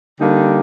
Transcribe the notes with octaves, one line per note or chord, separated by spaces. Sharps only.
D3 G3 A#3 D#4 G4